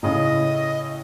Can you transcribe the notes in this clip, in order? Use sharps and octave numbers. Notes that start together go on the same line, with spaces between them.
A2 C#3 D#5